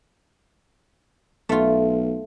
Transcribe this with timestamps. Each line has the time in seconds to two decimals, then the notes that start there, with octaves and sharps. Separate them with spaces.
1.49 B1 A3 F4